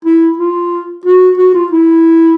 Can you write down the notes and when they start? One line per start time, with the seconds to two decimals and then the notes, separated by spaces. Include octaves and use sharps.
0.05 E4
0.38 F4
1.05 F#4
1.38 F#4
1.54 F4
1.72 E4